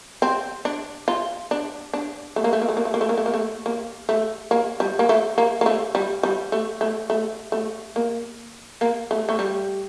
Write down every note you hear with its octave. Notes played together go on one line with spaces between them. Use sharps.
C4
D4
F4
D4
D4
A3
A#3
A3
A#3
A3
A#3
A3
A#3
A3
A#3
A3
A#3
A3
A#3
A3
A#3
G3
A#3
A3
A#3
A#3
A3
G3
G3
A3
A3
A3
A3
A#3
A#3
A3
A3
G3